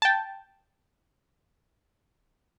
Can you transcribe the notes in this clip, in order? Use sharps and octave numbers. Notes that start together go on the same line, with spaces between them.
G5 A5